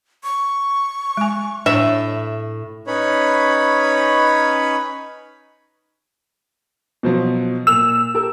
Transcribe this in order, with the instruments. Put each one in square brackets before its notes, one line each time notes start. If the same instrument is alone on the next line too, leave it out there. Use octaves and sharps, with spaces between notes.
[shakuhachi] C#6
[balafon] G#3 G#5
[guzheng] A2 [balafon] D4 [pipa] E5
[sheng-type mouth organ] C#4 D#4 B4 C#5 B5
[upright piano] B2 F3 F#3
[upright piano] A#2 F7 [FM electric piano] E6
[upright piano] G4 A4 A#4